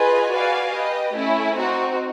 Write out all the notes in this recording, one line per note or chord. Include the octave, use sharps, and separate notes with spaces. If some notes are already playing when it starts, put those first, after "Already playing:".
Already playing: F4 G#4 B4 D#5 G#5
F#4 B4 D5 F5 G#5
G4 B4 D#5
A3 C#4 E4
C4 D#4 F#4